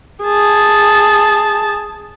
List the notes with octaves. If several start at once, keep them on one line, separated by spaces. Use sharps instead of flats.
G#4 A5